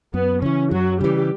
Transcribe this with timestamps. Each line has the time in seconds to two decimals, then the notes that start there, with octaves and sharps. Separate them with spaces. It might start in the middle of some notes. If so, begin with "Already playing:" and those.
0.14 F#2 B3
0.42 C#3 E3 C#4
0.71 F#2 F#3 F#4
1.01 C#3 E3 G3 G4